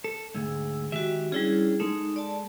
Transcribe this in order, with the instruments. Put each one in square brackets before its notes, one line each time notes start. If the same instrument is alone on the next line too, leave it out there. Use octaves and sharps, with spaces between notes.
[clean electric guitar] A4
[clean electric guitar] D2 G#2 [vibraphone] G#4 E6
[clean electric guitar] D#3 G4 E5 [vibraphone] G#3 F#4
[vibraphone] G3 E4 G#4 [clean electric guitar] C#4 D4
[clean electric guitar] G#3 A4 [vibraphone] D#4
[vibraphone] D5 A5